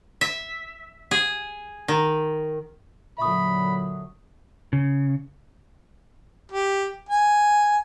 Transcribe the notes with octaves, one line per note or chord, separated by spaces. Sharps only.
E5
G#4
D#3
A#2 D3 F#3 E5 B5 C#6 D#6
C#3
G4
G#5